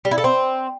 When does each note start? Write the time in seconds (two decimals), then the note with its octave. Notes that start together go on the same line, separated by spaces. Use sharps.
0.05 G3
0.11 E4
0.18 A4
0.24 C4